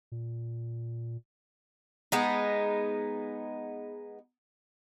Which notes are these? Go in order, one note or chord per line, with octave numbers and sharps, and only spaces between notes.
A#2
G#3 B3 D#4